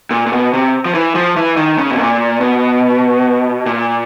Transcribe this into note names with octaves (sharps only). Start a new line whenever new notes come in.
A#2
A#2
B2
C3
F3
E3
F3
E3
D#3
C#3
B2
A#2
B2
A#2